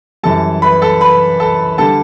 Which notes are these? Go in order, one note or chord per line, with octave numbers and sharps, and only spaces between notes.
F#2 E3 G3 A4 A5
B4 B5
A4 A5
B4 B5
A4 A5
D3 G3 A4 A5